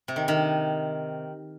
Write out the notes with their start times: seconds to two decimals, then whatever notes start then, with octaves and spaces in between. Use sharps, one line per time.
0.08 C3
0.16 D#3
0.28 D#3